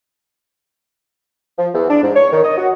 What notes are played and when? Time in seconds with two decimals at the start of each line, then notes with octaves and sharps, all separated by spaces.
1.59 F3
1.74 E2
1.90 D4
2.04 G#2
2.16 C#5
2.33 D#3
2.44 D#5
2.58 F#4